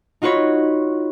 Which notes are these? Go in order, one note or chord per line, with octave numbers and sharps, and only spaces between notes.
D#4 F4 F#4 B4 C#5